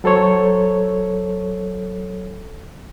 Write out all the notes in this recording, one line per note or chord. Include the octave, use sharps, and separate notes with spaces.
F#3 A4 C5 C#5